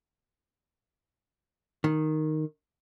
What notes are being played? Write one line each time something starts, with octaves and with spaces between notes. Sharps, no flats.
D#3